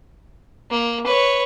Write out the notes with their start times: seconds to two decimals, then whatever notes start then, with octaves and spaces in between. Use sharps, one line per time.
0.70 A#3
1.06 B4 C#5